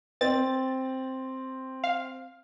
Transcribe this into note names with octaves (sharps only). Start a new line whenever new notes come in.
C4 A6
F5